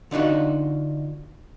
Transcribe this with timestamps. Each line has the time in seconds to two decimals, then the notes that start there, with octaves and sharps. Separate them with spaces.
0.11 D3 D4 D#4 F4 F#4